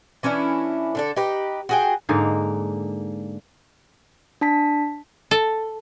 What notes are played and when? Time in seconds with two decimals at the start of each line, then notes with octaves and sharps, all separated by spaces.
0.23 E3 C#4 D4 E4
0.95 D3 D4 A4
1.16 D#4 G4 B4
1.69 F#4 G#4 G5
2.09 G#2 D3 A#3 D#4
4.41 D4 A5 B6
5.31 A4